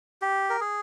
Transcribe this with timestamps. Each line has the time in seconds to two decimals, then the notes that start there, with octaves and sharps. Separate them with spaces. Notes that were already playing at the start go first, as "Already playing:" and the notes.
0.22 G4
0.50 A#4
0.60 G#4